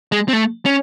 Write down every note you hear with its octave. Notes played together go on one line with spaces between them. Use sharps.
G#3
C4
A3
C#4